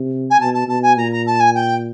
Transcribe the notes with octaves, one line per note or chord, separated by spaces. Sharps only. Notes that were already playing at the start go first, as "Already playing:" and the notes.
Already playing: C3
G#5
B2 A5
A5
B2 A5
G#5
A#2 A#5
A#5
A5
G#5
G5